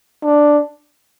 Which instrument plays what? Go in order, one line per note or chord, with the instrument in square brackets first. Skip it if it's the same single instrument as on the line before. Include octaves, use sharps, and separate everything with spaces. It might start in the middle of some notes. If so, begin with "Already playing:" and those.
[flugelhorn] D4